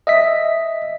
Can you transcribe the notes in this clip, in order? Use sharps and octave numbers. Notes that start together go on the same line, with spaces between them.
D#5 E5 B6